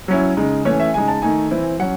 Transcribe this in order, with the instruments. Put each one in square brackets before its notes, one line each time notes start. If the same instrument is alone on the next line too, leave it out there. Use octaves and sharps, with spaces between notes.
[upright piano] F#3 C#4 E4
C#3 G#3 D#4
E3 A3 C#4 C#5
E5
C#3 G#3 D#4 G#5
A5
D#3 A3 D#4 G#5
E3 C4 E4
F#3 C#4 F#5